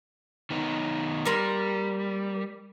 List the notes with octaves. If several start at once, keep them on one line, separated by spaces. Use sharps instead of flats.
D#3 B3 D#4
G3 A#3 A#4 C6